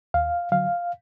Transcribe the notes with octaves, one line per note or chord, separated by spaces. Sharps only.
D#2 F5
D3 F#3 F5